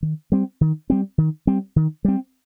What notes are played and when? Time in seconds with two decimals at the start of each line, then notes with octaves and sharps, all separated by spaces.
0.02 D#3
0.32 G3 C4
0.61 D#3
0.90 G3 C4
1.18 D#3
1.47 G3 C4
1.76 D#3
2.05 G3 C4